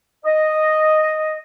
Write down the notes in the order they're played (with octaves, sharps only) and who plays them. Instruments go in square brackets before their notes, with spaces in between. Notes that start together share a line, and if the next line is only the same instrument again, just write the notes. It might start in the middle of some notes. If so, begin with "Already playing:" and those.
[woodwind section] D#5